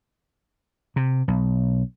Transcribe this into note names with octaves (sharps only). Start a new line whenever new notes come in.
C3
B1